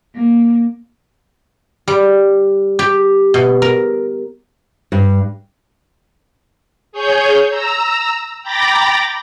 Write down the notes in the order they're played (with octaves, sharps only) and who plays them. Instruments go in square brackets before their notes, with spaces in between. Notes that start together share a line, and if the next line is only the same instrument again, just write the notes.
[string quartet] A#3
[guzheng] G3
G4
B2
A#4
[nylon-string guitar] G2
[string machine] G#4 C#5 G6
A#5 E6
G5 A#5 B5 D6 A6 A#6